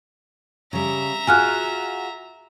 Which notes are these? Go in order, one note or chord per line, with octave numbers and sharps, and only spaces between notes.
C#3 G3 E5 A#5
F4 F#4 G#4 G#5 F6 F#6